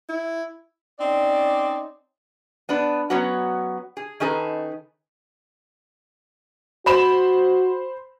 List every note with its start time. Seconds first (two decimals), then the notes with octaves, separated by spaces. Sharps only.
0.09 E4
1.00 C4 C#4 D#4 D5
2.69 B3 D4 B4
3.10 F#3 B3 C#4 F#4
3.97 G#4
4.20 D#3 C#4 D#4 G#4 A4 B4
6.86 F#4 C5 B5 E7